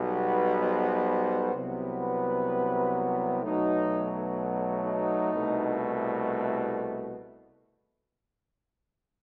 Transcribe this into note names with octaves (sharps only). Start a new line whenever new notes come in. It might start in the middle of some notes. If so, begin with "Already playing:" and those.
Already playing: B1 B2 G3 B3
B4
C5
C2 C3 F#3 B3
B4
B1 B2 F#3 A3 D#4
D#4
C2 B2 A3